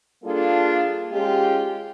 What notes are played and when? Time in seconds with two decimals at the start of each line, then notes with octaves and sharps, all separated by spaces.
0.24 G3 A#3 D4 F4 G#4 A4
1.12 G#3 C#4 F4 G4